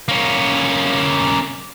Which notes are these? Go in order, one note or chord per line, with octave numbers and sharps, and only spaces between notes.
A#3 C#4